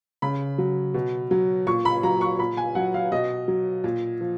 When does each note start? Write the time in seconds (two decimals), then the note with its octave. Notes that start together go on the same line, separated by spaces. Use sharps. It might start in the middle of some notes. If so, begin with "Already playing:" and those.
0.22 C#3 B5
0.58 F#3
0.94 B2
1.31 F#3
1.67 A#2 C#6
1.85 B5
2.03 F#3 A#5
2.21 C#6
2.39 A#2 B5
2.57 G#5
2.75 F#3 F#5
2.94 F5
3.12 B2 D#5
3.48 F#3
3.84 A#2
4.21 F3